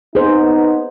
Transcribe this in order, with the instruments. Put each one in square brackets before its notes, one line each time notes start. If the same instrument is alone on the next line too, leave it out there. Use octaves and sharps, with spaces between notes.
[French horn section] B3 D#4 [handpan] G#4 C5